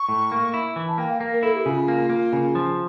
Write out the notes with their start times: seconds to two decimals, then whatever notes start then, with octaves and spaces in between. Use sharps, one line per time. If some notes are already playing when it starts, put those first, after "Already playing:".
Already playing: C#6
0.09 A2
0.32 A#3
0.54 E4
0.76 E3
0.87 A5
0.98 A#3 G5
1.09 F5
1.21 A#3
1.32 A#4
1.43 E4 A4
1.54 G4
1.65 C#3 F4
1.88 A#3
2.09 A#3
2.33 C#3
2.55 F3